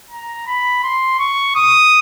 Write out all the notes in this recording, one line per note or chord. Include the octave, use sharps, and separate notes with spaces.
A#5
B5
C6
C#6
D#6